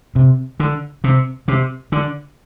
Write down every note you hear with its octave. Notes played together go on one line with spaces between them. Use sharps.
C3
D3
C3
C3
D3